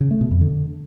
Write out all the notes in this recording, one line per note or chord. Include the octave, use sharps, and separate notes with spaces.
C#3
A3
B2
F2
D3